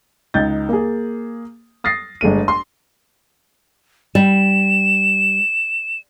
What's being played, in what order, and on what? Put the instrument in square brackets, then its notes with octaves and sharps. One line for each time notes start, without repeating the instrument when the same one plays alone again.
[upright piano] C#2 D#4 G6 A6
A#3 G#4
D#6 A6 A#6 C7
G1 G#3 A3 D#7
C6
[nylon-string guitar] G3 [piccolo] E7